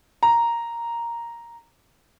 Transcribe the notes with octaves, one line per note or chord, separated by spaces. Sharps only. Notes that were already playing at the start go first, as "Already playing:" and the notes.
A#5